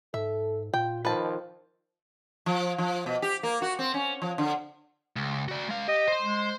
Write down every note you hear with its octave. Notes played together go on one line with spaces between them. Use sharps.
G#2 A4 E5
A#2 F4 G5
D#3 F3 B4 A5
F3
F3
B2
G4
A#3
F#4
C4
C#4
F3
D3
C#2
F#4 D5
G#3 F5
G4 D#5
C5 C6
G#3